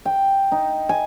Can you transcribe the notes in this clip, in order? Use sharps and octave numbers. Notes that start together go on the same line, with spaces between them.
G5
D#4
G#5